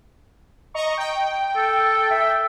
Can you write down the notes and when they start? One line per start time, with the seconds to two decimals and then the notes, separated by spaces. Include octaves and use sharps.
0.74 D#5 A#5 C#6
0.97 G5
1.56 A4
2.11 E5